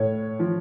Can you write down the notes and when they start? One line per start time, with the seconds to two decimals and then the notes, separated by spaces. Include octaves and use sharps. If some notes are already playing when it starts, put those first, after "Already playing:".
Already playing: A2 C#5
0.39 F3